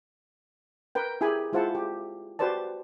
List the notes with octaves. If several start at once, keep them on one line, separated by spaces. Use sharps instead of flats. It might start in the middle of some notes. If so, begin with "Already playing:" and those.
A#4 B4 G5
E4 G4 G#4 G#5 B5
G#3 E4 F4 C5 F#5 A5
G4
F#4 G4 B4 C5 D5 A5